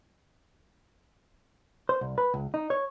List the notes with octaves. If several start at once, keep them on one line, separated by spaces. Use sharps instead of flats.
C5
C2
B4
C#2
D#4
C#5